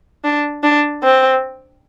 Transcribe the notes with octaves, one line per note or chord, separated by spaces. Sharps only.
D4
D4
C4